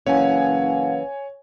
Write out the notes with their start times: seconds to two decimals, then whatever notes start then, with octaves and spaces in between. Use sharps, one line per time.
0.06 F#1 E3 C#4 C#5 F5 F#5 G#5